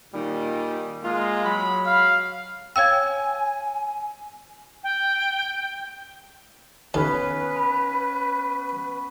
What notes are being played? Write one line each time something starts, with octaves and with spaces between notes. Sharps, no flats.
A#2 D#3 G3
G#3 A#3 F4
F#3 B5
F5
C#5 F5 G5 G#5 E6 G#6
G5
D#2 B3 C#4 A4 B4 F5
B5